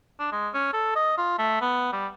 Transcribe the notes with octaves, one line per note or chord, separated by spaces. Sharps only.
D4
G#3
C#4
A4
D#5
F4
A3
B3
G3